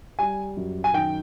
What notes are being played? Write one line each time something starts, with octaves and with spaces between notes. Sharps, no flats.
G3 G#5
F#2
G#5
D#3 G5